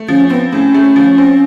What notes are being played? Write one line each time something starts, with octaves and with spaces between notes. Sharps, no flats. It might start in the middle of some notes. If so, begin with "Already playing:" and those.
Already playing: A3
F3 C#4
B3 C4
A2 C#4
A3
F3
C4